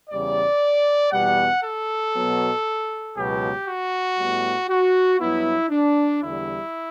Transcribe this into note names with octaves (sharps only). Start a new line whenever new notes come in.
E2 C#3 G3 D5
E2 B2 G3 B3 F#5
A4
B2 F#3 B3
C#2 B2 F#3 B3 G4
F#4
A2 G3 B3
F#4
G2 F#3 B3 E4
D4
E2 D3 G3 E4